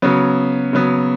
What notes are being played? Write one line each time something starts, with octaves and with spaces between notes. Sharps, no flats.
C#3 F#3 B3
C#3 F#3 B3